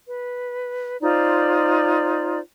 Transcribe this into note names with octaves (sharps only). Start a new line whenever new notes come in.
B4
D#4 F4 C5 D5